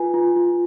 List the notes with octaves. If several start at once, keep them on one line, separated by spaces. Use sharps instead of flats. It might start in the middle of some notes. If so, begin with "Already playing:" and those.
Already playing: F4 B4 G#5
F4
F4